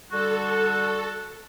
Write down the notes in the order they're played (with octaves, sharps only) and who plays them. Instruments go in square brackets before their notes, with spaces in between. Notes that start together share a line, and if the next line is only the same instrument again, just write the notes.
[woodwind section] D3 G3 F#4 [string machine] A4